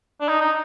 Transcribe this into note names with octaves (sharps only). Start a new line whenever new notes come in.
D4
D#4
D#4